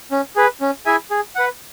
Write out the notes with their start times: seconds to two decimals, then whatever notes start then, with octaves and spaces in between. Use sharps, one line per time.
0.11 C#4
0.36 G#4 B4
0.61 C#4
0.86 E4 G#4 E5 G#5
1.11 G#4
1.35 B4 F#5